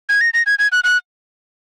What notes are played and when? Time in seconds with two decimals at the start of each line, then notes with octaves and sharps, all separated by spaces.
0.09 G#6
0.21 A#6
0.34 A#6
0.46 G#6
0.59 G#6
0.72 F#6
0.84 F#6